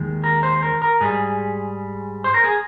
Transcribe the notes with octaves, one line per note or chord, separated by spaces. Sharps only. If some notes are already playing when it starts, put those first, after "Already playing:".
Already playing: D#2 D#3 G#3
A#4
C5
A#4
A#4
G#2 G3 G#4
C5
A#4
G#4